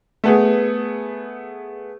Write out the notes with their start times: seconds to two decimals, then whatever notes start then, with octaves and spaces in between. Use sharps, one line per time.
0.24 A3 B3 G#4